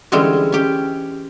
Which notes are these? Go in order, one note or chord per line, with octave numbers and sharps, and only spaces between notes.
D3 E3 G3 G#3 C4 C#4
C#4 G4